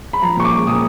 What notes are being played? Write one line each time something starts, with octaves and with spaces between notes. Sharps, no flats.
B5
F3 A#5
A#2 C#6
D6
G#3
A#2 D#6